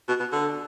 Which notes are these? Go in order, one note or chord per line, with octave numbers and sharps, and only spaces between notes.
B2
B2
D3